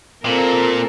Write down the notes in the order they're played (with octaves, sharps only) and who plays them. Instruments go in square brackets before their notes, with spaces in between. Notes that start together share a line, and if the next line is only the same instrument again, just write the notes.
[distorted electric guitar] A#2 [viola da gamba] C4 A4 A#4